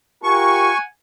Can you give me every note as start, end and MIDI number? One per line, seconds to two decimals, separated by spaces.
0.23 0.71 65
0.23 0.71 67
0.23 0.71 70
0.23 0.82 78
0.23 0.82 80
0.23 0.78 85